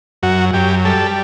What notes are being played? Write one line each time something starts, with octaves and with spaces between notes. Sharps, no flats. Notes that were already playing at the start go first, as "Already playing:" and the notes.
F#2 F#4
F#2 G4
G3 A4